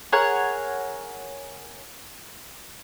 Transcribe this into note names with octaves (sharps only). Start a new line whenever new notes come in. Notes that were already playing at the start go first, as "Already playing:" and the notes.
G#4 A#4 C#5 F#5